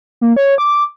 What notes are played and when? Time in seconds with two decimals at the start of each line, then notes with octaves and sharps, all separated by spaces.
0.21 A#3
0.36 C#5
0.58 D6